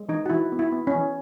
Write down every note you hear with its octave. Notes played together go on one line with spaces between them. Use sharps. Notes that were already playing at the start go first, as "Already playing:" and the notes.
Already playing: G#3
E3 D#4
F#4
E3 E4
B3
E4
B3
C#4
E3